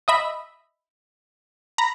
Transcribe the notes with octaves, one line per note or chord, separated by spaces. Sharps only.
D#5 E5 B5
A#5 B5 A#6